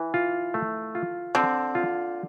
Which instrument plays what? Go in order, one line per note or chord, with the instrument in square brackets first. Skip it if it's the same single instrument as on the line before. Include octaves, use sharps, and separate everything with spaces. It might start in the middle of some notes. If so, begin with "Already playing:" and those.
Already playing: [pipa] E3
[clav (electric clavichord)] F4
A3
F4
[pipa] D3 [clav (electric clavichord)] C4
[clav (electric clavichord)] F4